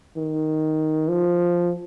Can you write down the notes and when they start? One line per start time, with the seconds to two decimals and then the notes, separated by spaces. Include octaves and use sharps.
0.17 D#3
1.09 F3